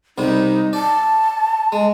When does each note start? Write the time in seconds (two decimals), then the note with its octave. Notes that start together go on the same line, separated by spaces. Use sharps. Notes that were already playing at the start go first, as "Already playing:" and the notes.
0.18 C2 C3 G3 D#4
0.73 D5 A5
1.72 G#3